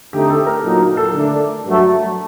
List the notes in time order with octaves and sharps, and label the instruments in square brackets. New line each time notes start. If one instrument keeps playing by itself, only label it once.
[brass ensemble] D3 A3 C4 D#4 [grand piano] G4
[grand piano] A4
A#4
[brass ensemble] A#2 F#3 A#3 D#4
[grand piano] A#4
A4
[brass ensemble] D3 A3 D4
G2 F#3 A3